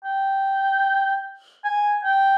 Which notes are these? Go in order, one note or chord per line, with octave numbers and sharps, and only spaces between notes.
G5
G#5
G5